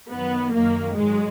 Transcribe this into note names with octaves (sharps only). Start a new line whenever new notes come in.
F#2 D#3 F#3 B3
F#2 D#3 F#3 A#3
G#2 F#3 G#3